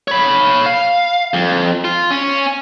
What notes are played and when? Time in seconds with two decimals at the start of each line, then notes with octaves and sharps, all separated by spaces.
0.08 C#5 B5
0.66 F5
1.34 F2
1.85 F4
2.11 C#4